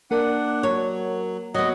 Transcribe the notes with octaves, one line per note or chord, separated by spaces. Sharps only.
A#3 D4 A#4 F#5
F#3 C#5
F#3 B3 D#5